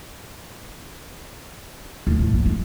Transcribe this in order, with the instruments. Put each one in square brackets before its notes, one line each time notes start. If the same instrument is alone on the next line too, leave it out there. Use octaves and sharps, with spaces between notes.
[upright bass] D2
A2
F#2 D3
G#3